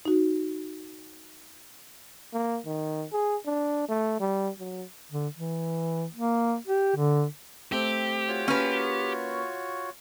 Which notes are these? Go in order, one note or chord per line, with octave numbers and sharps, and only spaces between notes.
D#4 F#4
A#3
D#3
G#4
D4
A3
G3
F#3
D3
E3
A#3
G4
D3
A3 C4 G4
F4 F#4 C#5
A#3 C#4 A#4 B4